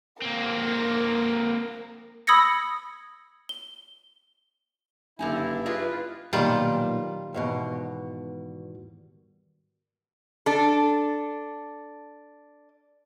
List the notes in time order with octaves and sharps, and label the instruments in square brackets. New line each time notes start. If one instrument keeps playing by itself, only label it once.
[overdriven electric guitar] A#3 C4 [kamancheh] A#4
[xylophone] B5 D#6 E6 G#6 A#6 C#7
G7
[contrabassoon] F#1 [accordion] G2 E4 [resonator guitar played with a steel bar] D3 D#4 G#5
[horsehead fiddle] F4 B4 [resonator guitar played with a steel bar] G#4 D5 D#5
[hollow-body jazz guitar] B1 A#2 [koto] D#3 G3 F4
[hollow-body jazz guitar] E2 G#2 B2
[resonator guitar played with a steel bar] D4 A4